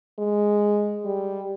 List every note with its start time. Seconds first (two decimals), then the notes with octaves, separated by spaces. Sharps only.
0.19 G#3
1.05 G3